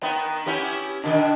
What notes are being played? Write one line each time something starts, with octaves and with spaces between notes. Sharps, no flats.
B3 D#4 G5
B3 C#4 E4 G4
B2 D3 D#3 D4